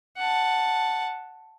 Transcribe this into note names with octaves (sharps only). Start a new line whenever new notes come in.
F#5 A5